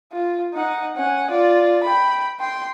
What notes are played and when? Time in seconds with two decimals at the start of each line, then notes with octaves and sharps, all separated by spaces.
0.12 F4
0.54 D#4 F#5
0.96 C#4 F#5
1.30 F4 D5
1.84 G5 B5
2.40 G5 C6